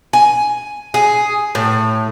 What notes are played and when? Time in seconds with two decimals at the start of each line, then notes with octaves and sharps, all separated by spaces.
0.13 G#5
0.94 G#4
1.55 A2